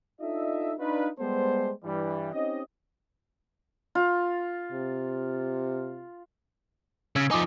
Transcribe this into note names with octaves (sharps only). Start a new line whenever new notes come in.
D4 D#4 F4 A4 D#5 E5
D4 D#4 F4 B4
G3 G#3 B3 G4 A4 C5
G2 E3 G3
C4 C#4 D#4 G4 D#5
F4
C3
C#3 E6 G#6
F3 D#4 G#5 D6 D#6